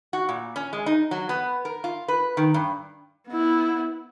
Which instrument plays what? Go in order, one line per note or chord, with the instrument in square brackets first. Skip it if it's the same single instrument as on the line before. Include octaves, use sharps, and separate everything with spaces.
[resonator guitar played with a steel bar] F#4
A#2
C#4
G#3
D#4
F#3
B3
A#4
F4
B4
D#3
G2
[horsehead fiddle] B3 E4